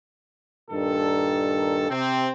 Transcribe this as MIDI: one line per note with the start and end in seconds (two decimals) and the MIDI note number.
0.71 1.89 43
0.71 1.89 46
0.71 1.89 51
0.71 1.89 69
1.89 2.30 48
1.89 2.30 60